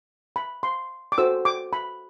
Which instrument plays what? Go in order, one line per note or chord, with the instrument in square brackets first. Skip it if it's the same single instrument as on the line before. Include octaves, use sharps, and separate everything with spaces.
[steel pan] B5
C6
D6
F#4 A4 C5 E6
D6
B5